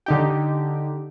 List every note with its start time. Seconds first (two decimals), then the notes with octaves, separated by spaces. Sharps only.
0.06 D3 D#4 G4